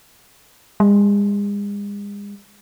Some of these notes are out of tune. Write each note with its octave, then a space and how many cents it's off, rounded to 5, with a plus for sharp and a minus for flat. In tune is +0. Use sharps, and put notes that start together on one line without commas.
G#3 -40